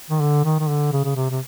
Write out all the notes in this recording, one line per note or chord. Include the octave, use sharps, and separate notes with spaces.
D#3
D3
D#3
D#3
D3
C#3
C#3
C3
C3